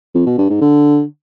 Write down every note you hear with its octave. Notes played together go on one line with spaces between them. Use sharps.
F2
B2
G2
G#2
D3